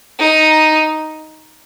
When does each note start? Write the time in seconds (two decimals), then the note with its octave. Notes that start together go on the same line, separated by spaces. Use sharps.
0.19 D#4